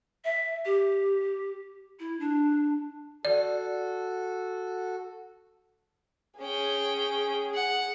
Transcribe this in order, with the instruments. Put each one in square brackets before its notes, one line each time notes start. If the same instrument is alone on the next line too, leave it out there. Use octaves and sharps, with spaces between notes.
[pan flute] E5
G4
E4
D4
[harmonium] F#4 A4 [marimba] D5
[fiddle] C#4 G5 [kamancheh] G#4
[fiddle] F#5